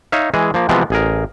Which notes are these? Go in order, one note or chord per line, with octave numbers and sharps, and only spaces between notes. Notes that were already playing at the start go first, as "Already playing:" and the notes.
D#4 C#5 E5 F5
E3 G#3 G#4
F3 A#3
C3 E3 F3 G#3 B3 C4
A1 G#4 A#4